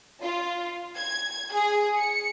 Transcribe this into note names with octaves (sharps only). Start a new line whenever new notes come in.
F4
G#6
G#4
C#7